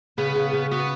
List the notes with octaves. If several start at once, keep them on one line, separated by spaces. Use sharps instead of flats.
C#3 B3
C#3
C#3
B3 F#4